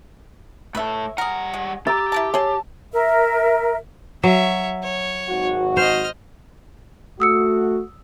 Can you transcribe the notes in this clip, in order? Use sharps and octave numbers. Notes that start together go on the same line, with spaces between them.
A2 A4 B4 E5
G3 G#4 A#4 F#5
G#3
G4 A#5 E6 A6
E4 A#4 A5
G#4 C#5 A5 C6
A#4 E5
F#3 C#5 E5
C#5
G#1 F#4
C5 D#5 F6
A3 F#4 D#6 E6 C#7